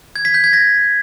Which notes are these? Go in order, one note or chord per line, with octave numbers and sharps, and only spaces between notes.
G#6
B6
G6
G#6
A#6